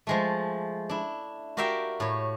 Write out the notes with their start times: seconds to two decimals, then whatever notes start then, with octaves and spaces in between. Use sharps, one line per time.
0.07 F3 G#3 A3
0.89 D4 E4
1.57 F#4 G4 A#4 E5 F5 G5
2.00 A2 C#5